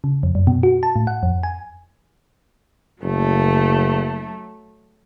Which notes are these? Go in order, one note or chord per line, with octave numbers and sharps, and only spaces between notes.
C#3
F2
F#2
B2
F#4
A5
A2
F#5
F2
G#5
F#1 F#3 A3